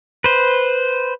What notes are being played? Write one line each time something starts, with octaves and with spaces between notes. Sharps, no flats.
B4 C5